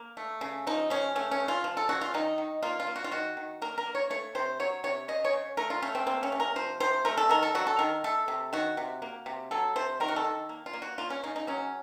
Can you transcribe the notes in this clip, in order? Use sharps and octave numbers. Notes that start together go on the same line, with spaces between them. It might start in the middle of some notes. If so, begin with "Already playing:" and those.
Already playing: A#3
A3
C#3
F3 D#4
C#3 C#4
A3 C#4
C#4
C#3
F4
F3
A4
C#3 F#4
F4
D#3 D#4
D#3
A#3 F4
F4
A#3
F#4
F4
D#3 F#4
D#3
A#3 A#4
A#4
A#3
C#5
A3 C#5
C3 C5
F#3 C#5
C3 C#5
C#3 D#5
C#5
C#3
A3 A#4
F4
A3 C#4
C4
A#3 C4
C#4
C3
A#4
F3 C5
C3 C5
A3 A#4
A4
D#3 A#4
A4
F#3 F#4
A4
D#3 A#4
A3 A4
C3
D#3 F#4
C3
A#3
C3
F#3 A4
C3 C5
D#3 A#4
F#4
A4
D#3
A#3
F4
A#3
F#4
A#3 F4
C#4
C#3 D#4
D#4
F#3 C#4